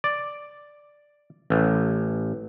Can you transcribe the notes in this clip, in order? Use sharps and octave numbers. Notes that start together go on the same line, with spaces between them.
D5
A1